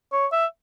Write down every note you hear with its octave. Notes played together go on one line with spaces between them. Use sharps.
C#5
E5